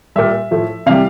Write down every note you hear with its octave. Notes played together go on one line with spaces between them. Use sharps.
A#2 G3 E5
A2 F3 A3
C3 E3 G3 F5